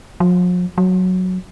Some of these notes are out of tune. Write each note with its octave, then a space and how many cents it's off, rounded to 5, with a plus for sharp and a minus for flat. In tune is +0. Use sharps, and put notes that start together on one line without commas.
F3 +45
F#3 -5